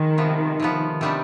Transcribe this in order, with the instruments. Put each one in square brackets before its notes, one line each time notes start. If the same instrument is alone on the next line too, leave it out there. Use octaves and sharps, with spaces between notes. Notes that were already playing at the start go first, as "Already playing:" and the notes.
Already playing: [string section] D#3 [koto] G#3
[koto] C3 F3 B3
C3 F3 B3
C3 D#3 G3 B3 D4